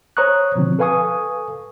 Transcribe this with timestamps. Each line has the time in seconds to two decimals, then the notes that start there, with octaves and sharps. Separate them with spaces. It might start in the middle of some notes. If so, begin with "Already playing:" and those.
0.17 C5 C#5 A#5 C#6 D#6 F#6
0.55 B2 D3 F3 C4
0.79 A4 B4 F5 G#5 C#6 D#6